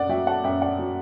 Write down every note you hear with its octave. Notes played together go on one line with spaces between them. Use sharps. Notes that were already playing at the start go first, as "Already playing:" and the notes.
Already playing: F#2 D5 F#5
F#3 E5 G5
F#5 A5
F#2 E5 G5
D5 F#5
F#3